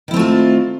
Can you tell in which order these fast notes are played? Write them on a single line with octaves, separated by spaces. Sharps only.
D#3 E4 C4 A3 F4